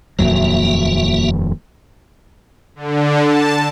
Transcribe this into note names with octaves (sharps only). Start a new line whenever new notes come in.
D#1 F2 F#3 A#3 F#4 E5
D3
A5